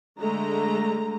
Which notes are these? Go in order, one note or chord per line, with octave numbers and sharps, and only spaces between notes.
D3 G#3 A3 A#5